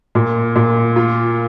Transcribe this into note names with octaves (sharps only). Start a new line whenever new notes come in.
A#2
A#2
F4